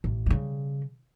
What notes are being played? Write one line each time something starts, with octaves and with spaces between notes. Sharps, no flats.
A1
C#3 G3